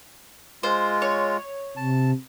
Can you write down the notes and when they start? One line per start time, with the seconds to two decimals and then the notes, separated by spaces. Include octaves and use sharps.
0.63 G#3 F4 C5
1.02 C#5
1.77 C3 A5